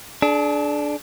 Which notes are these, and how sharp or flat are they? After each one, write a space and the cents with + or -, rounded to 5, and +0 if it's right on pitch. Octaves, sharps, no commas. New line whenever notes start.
D4 +0 G#4 +45